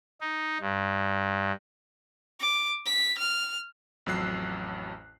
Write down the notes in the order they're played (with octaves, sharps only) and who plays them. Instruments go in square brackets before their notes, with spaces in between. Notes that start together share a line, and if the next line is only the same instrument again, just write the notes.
[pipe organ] D#4
G2
[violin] D6
B6
F6
[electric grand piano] A1 F2 F#3 E6 F#6 C7